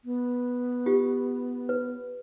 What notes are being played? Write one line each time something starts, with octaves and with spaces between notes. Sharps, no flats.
B3
F4 G4
B4